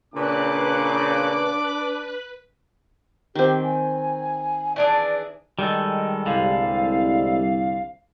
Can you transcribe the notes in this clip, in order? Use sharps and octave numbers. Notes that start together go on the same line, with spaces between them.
A#2 C#3 D4 B4 D6 F#6
D#3 C4 G4
G#5
E3 D4 G#4 D5
D#3 G3 G#3 A4
C2 G2 D3 F5